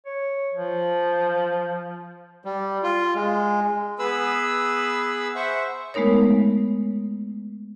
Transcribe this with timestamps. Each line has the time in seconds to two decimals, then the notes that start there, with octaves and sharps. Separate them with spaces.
0.06 C#5
0.54 F3
2.45 G3
2.83 F4
3.15 G#3
3.99 B3 G#4 B4 B5 E6
5.35 C5 E5 F#5 C#6
5.94 G#3 A3 B3 D#4 A#4 C#5